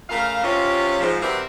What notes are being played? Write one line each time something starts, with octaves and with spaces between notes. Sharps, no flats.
C#3 A3 A#4 F5
C3 C#4 F4
G#2 F3
C3 E3 G3 C4 F#4 A#4